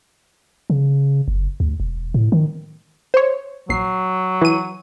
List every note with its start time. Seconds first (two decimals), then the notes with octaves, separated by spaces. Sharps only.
0.70 C#3
1.28 F#1
1.60 D2
1.80 E1
2.14 A2
2.32 D#3
3.14 C5 C#5
3.69 A#1 F#3 C7
4.41 E3 D#7